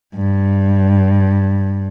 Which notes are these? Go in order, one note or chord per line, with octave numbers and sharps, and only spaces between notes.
G2